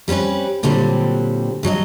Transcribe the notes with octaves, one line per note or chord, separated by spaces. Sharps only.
G3 A#3 C4 C#4 B4
A#2 D3 F#3 G3 C4
G2 F#3 G#4 D#5